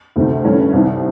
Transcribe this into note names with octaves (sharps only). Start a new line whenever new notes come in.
D2 C3 D#3
G2 E3 A3 C#4
C2 C3 D#3